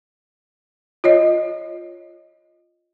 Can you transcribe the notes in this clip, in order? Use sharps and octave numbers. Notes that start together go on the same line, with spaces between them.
F4 C#5 D#5